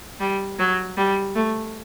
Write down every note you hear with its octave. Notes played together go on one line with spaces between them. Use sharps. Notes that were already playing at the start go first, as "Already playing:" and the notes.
G3
F#3
G3
A3